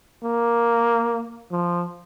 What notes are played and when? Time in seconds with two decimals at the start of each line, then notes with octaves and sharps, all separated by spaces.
0.24 A#3
1.51 F3